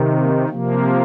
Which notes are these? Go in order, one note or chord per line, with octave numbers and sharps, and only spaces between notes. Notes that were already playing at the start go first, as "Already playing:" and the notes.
Already playing: C3 D#3
A#3
C3 F3 A#3